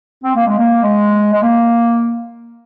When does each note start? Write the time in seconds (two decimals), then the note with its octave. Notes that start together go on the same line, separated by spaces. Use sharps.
0.24 C4
0.36 A#3
0.47 G#3
0.59 A#3
0.83 G#3
1.34 G#3
1.43 A#3